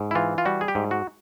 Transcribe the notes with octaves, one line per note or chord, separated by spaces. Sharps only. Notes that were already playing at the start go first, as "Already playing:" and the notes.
Already playing: G#2
E4
E3 F4
F4
G3 F#4
G#4
G4
G#2
F#4